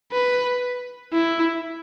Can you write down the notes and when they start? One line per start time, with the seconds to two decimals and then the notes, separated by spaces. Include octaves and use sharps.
0.12 B4
1.13 E4